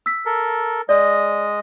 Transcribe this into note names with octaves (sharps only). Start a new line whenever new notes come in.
E6 B6
A4 A#4
G#3 D5 D#5